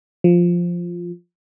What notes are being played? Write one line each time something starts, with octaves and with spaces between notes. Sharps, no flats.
F3